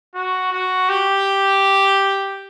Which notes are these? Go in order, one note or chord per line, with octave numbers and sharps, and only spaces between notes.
F#4
F#4
G4